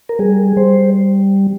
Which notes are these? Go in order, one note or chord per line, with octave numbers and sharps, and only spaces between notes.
A#4
G3 G#4
G3 C5